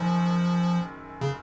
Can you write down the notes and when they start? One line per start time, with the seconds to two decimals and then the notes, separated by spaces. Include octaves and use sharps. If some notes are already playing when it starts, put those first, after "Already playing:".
Already playing: F#1 F#2 D#3 F3
1.21 C#3